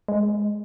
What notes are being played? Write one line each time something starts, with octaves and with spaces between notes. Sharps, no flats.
G#3